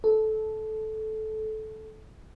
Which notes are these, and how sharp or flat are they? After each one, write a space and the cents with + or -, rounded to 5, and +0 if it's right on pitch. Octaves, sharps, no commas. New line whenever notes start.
A4 -15